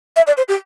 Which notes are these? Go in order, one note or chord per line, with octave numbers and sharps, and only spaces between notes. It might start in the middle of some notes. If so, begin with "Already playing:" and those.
E5
D5
C5
G4